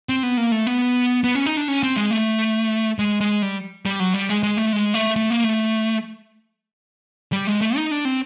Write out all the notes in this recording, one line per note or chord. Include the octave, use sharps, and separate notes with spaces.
C4
B3
A#3
A3
B3
B3
C#4
D#4
D4
C#4
C4
G#3
A3
G#3
G#3
G3
G3
F#3
G3
G#3
G#3
A3
G#3
A3
A3
A#3
A3
G3
G#3
A3
D#4
D4
C4